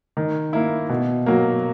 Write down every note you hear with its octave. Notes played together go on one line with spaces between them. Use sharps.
D#3
A#3 E4
B2
F#3 A#3